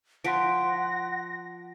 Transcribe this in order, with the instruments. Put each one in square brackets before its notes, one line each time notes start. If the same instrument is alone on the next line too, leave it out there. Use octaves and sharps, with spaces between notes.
[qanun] F3 [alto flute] F#5 [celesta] C6 B6 D7 [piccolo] A#6